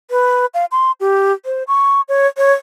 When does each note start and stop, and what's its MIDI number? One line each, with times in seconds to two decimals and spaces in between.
0.11 0.46 71
0.54 0.65 77
0.72 0.92 84
1.00 1.33 67
1.45 1.63 72
1.68 2.01 85
2.09 2.27 73
2.37 2.52 73